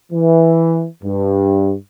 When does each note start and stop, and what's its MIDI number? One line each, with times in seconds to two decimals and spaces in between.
0.12 0.85 52
1.04 1.74 43